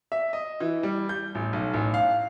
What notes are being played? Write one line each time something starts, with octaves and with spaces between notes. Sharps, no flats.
E5
D#5
E3
G3
G6
A1
B1
A1
F5